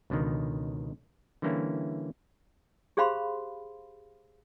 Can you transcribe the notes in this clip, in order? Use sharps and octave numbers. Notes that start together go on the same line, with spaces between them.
C#2 B2 D3 D#3
D3 E3 G3 A#3 C#4 E4
G4 G#4 C5 F5 B5 C6